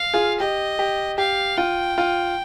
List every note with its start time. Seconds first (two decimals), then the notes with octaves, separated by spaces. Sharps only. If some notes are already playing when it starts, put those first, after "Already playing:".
Already playing: F5
0.14 F4 G#4
0.40 G4 D#5
0.79 G4
1.18 G4 F5
1.57 F4 G5
1.98 F4